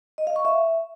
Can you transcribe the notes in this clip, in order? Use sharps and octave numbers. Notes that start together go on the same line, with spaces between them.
D#5
F5
C#6
E5